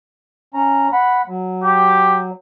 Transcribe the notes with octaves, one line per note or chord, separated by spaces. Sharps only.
C#4 A#5
F#5 B5
F#3
G4